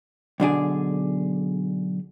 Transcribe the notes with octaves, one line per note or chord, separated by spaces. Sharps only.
B1 D3 D4 G#4